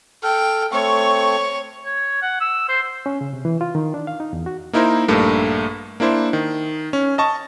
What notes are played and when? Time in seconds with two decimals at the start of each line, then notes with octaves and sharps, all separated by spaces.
0.23 A4 G5 F6
0.72 A3 C4 C#5 C#6
1.85 C#5
2.22 F#5
2.41 E6
2.69 C5
3.06 C#4
3.21 C#3
3.33 C3
3.45 E3
3.61 F4
3.75 D#3
3.94 D4
4.07 F5
4.20 D#4
4.33 E2
4.46 F#4
4.73 A#3 D#4 E4 A#4 C5
5.08 A#1 G2 A3 A#3
6.00 A#3 D4 E4 C5
6.33 D#3
6.93 C#4
7.18 D#5 A5 C#6